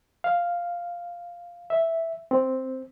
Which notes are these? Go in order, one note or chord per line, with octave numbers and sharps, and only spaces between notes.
F5
E5
C4